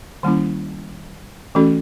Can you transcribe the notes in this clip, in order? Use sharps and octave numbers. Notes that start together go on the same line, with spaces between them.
D#3 G3 A#3 C#4 E4
E3 A3 C#4 F#4 A4